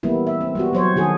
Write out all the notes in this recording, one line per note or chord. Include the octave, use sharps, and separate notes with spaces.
E3 G3 A#3 B3 E4
E5
C4
G3 B3 F#4
F#3 C5 C#5
D#3 F#4 G#4 A4